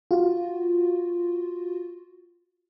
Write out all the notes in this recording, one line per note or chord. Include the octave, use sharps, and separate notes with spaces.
F4 F#4